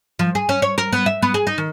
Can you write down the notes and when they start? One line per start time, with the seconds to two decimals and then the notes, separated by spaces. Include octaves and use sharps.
0.19 F3
0.35 G#4
0.49 C#4
0.62 C#5
0.78 A#4
0.93 B3
1.06 E5
1.22 B3
1.34 G#4
1.47 D#4
1.58 D#3